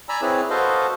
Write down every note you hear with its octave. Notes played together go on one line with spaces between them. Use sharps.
D5 G#5 A#5 B5 E6
C4 E4 G#4 B4 C#5
F#4 A4 B4 C5 D#5 F5